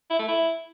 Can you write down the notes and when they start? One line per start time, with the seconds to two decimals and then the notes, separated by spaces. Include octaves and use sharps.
0.10 E4
0.19 A3
0.28 E4